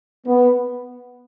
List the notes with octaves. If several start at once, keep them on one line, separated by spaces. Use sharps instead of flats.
B3